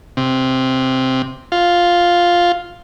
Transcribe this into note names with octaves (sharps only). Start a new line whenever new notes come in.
C3
F4